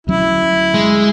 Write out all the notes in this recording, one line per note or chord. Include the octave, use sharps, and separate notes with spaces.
D2 F#3 C#4 E4
G#3